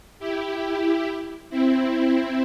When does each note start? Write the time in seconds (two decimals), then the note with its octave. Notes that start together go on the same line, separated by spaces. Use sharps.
0.19 E4 G4
1.50 C4 E4